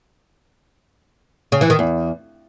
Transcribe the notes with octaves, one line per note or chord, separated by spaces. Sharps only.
C#3
E3
D#3
E2